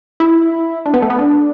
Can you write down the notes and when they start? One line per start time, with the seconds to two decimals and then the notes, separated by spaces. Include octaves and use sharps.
0.20 E4
0.86 D4
0.94 B3
1.02 A3
1.10 B3
1.19 D4